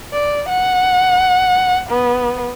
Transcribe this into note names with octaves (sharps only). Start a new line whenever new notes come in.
D5
F#5
B3